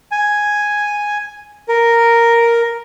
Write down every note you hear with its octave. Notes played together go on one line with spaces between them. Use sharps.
G#5
A#4